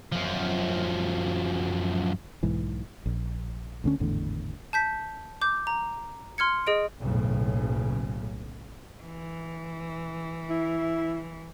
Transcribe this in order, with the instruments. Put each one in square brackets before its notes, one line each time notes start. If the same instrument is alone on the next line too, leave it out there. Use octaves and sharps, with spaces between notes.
[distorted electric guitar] F#2 F3
[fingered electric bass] B1 G#2 E3
A#1
D2 D3 C#4
G#1 E2 A2 D3
[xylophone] A5 G6 B6
D6 G6
A#5
C6 F6 G#6 C#7
G#4 D#5 D7
[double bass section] F#1 B1 A2 C#3
[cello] E3
[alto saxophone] E4